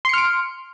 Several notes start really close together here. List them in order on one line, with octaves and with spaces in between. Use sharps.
C6 C#7 F6 D7